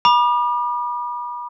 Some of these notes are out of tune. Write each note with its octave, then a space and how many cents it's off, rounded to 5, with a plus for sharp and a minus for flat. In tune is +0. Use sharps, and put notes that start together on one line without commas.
B5 -35 D6 +40